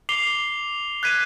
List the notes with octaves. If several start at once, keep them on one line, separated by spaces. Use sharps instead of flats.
D6 C7 F7 G7
F#6 G#6 B6 D#7